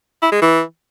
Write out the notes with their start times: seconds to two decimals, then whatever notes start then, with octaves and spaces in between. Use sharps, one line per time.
0.22 E4
0.32 G#3
0.42 E3